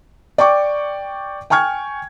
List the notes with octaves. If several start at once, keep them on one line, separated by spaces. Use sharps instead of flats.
D5 G5 C#6 D6
G5 G#5 C#6 F6 G#6